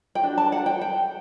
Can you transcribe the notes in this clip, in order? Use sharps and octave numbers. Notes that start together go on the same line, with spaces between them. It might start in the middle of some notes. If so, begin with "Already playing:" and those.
G5
D4 F#4
A5
F#5
G5
G5